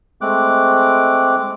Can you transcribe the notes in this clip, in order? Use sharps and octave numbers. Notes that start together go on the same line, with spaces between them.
G#3 A3 C4 D6 F#6